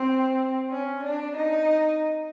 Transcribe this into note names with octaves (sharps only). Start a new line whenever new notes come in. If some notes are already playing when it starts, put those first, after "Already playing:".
Already playing: C4
C#4
D4
D#4